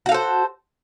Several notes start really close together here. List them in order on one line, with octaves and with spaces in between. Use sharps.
F#4 F5 A4 C5